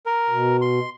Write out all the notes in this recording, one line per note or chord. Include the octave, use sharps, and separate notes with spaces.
A#4
B2
C6